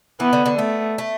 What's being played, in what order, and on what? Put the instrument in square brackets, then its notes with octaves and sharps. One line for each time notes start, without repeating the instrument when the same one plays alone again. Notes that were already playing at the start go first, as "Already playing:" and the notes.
[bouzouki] E3 [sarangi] B3
[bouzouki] D3
D3
[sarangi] A3 [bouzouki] B3
[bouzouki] A3